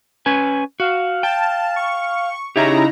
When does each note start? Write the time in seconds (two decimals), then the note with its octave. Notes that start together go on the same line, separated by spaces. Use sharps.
0.26 C#4 B4 G#5
0.80 F#4 F5
1.23 G5 A5
1.76 C#6
2.56 C#3 D#4 E4 G4 C#5 A#5